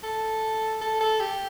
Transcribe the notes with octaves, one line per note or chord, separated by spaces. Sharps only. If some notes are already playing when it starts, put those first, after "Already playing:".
A4
A4
A4
G4